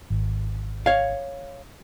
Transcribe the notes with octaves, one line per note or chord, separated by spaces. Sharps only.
G#1
C#5 F5